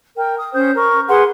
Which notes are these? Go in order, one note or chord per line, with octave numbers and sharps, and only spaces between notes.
A#4 G5
D#6
C#4 C5 D#6 G6
A#4 C#6
G#4 B4 F#5 C6